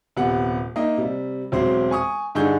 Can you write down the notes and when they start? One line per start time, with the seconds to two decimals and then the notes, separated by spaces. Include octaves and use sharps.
0.16 D#1 C3 B3 F#5
0.76 A#3 D#4 D#5 E5
0.98 C3 G3
1.52 E1 F#3 C4 C5
1.91 G#5 C#6 D#6
2.35 G2 D3 D#4 G#4 C#6 G6